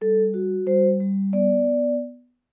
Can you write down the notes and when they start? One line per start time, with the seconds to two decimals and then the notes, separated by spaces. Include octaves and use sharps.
0.01 G3 A4
0.34 F#4
0.67 G3 C5
1.00 G3
1.33 B3 D5